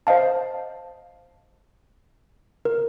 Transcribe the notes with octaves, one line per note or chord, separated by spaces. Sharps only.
C5 D#5 F5 A5
A#4